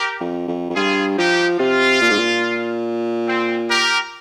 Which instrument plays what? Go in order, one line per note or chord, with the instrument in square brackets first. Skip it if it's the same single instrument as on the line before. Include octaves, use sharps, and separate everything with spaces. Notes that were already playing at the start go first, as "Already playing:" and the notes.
Already playing: [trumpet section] G4 A#4
[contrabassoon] F2
F2
F2
[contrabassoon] G2 [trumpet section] F4 G#4
[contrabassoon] F3 [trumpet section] D#4 G4
[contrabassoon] C3 [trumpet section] F4
[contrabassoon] A#2
G#2
A#2
[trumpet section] C4
G4 A#4